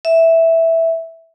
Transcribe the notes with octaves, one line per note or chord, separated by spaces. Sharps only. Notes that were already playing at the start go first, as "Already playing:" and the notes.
E5